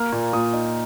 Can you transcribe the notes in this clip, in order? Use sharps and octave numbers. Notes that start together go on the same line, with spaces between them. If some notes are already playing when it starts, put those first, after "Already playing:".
Already playing: A#3 F6
A#2
A#2 D#6
D#4